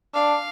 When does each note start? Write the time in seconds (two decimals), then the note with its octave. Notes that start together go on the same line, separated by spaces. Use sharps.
0.14 D4 F5